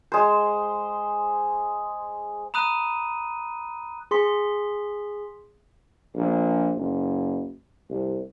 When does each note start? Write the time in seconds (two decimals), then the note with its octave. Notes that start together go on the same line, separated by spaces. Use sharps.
0.12 G#3 C5
2.54 A#5 B5 D#6 F#6 D#7
4.11 G#4 C6 B6
6.15 A#1
6.76 F#1
7.89 C2